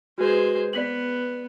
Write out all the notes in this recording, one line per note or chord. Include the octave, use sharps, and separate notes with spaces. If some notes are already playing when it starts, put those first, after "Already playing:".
G#3 F#4 B4 C5
B3 D5 B6 F#7